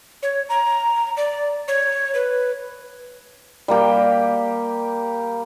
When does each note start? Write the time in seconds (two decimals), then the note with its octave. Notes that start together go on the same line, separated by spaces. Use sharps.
0.23 C#5
0.49 A#5
1.17 D5
1.68 C#5
2.15 B4
3.68 G3 A#3 G4